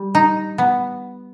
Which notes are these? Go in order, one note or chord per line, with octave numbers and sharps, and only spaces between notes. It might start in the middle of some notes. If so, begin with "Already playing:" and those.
Already playing: G3
D#4
B3